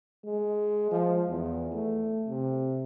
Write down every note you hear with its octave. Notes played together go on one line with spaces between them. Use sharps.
G#3
F3
E2
A3
C3